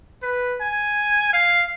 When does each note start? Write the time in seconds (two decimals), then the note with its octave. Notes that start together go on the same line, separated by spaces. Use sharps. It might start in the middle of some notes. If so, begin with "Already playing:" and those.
0.23 B4
0.61 G#5
1.34 F5